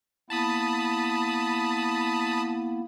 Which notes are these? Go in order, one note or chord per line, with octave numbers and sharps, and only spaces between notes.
A#3 B3 E4 A5 B5 D#6